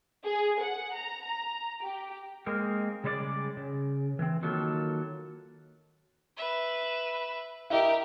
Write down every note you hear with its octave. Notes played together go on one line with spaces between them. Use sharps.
G#4
F#5
A#5
A#5
G4
G#3 A#3 C4 A#4
C#3 G3 G#3 C5 D5
C#3
E3 C4
D#3 F#3 A#3 F4 A4
B4 E5
E4 G4 A#4 D#5 E5